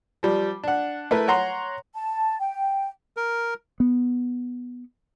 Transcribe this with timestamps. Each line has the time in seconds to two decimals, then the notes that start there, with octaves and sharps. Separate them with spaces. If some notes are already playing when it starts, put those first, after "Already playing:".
0.23 F3 G3
0.64 D4 F#5
1.11 A3 E4 A#4 B4
1.28 C#5 F#5 A#5 C6
1.94 A5
2.40 G5
3.17 A#4
3.80 B3